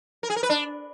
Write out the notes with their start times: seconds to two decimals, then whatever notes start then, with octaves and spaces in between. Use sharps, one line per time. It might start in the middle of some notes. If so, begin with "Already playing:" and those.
0.23 A#4
0.30 G#4
0.36 A#4
0.43 B4
0.50 D4